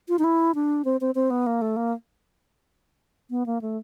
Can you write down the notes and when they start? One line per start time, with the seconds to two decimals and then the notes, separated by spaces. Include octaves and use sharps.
0.09 F4
0.19 D#4
0.24 E4
0.55 D4
0.85 C4
1.01 C4
1.15 C4
1.30 B3
1.46 A#3
1.62 A3
1.77 A#3
3.30 B3
3.46 A#3
3.61 A3